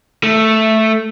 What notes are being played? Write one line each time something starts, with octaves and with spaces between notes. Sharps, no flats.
A3